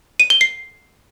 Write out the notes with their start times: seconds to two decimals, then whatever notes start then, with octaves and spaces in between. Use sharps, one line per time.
0.20 D#7
0.30 G7
0.41 C7